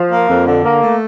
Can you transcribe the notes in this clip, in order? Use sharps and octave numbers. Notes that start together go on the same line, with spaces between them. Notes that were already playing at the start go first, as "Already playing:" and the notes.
Already playing: F3
A#3
F2
D3
A#3
A3